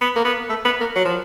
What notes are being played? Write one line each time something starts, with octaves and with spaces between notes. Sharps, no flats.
B3
A#3
B3
A3
B3
A#3
F#3
F3